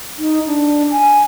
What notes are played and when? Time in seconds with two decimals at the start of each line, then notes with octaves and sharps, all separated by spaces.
0.19 D#4
0.47 D4
0.91 G#5